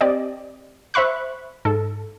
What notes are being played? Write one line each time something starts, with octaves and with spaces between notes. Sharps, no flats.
C4 G4 D5 D#5
C5 E5 B5 C#6 F#6
G#2 A4